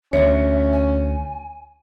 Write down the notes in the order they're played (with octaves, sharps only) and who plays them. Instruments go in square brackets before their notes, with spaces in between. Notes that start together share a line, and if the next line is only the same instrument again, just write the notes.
[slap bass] D2 [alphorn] C#4 [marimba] C#5 [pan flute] E5
[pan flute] G#5